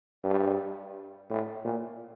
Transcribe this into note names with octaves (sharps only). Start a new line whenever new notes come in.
G2
A2
A#2